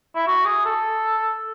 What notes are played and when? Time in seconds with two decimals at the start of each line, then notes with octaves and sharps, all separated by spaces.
0.15 E4
0.27 F#4
0.45 G#4
0.65 A4